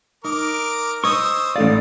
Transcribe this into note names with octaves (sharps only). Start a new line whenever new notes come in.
D#4 A#4 D6
C5 C#5 D#5 C#6 D#6 E6
A1 A3 D5 F5